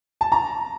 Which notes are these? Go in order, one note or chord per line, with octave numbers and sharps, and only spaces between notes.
A5
A#5